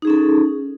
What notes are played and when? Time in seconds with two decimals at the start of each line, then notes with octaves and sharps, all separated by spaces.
0.02 D#4
0.05 G#4
0.07 C#4
0.10 A4